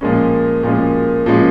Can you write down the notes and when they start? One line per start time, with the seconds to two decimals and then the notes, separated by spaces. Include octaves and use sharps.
0.01 A#2 F3 G#3 C#4
0.63 A#2 F3 G#3 C#4
1.26 A#2 F3 G#3 C#4